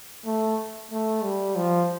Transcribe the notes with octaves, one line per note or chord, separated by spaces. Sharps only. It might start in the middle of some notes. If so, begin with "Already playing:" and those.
A3
A3
G3
F3